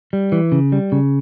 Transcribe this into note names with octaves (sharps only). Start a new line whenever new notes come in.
G3
E3
C#3
G3
C#3